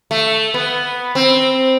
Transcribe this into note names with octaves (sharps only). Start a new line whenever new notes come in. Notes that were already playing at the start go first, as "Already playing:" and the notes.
A3
B3
C4